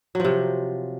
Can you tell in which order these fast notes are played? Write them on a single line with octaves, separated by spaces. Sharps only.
F#3 F3 C3